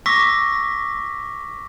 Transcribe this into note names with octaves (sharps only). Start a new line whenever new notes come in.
C#6 D6 E6 A#6 B6